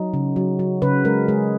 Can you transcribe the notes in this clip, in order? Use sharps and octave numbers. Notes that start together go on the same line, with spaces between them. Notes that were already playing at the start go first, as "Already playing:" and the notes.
Already playing: F#3 D#4
C#3
F#3
F#3
C#3 B4
G#3 A#4
G#3 G#4